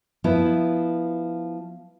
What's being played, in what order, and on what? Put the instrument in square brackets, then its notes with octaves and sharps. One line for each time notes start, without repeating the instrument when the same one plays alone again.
[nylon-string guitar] F3 B3 E4